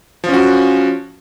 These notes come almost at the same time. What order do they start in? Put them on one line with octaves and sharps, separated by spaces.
F3 C#4 F#4